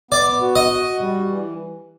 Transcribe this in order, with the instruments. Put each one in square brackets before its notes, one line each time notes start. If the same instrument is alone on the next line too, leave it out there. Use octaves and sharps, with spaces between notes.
[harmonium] B3 [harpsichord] D5
[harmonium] F#4
[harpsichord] D#5
[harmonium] F#4
G3
E3